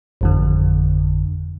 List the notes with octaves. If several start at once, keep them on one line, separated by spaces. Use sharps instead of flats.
G#1 F2 D3